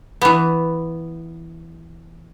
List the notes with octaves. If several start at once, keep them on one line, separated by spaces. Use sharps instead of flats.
E3 B3